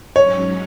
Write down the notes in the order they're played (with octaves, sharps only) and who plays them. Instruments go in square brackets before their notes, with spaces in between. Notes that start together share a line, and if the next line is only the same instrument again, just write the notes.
[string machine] G#2 F#3 C#4 [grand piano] C#5